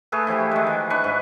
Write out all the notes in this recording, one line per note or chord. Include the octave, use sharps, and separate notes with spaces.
A3 G#4 A4 B4
E3 F3 E4 G4
D#3 G#3
E3
D4 B4 C#6
G#2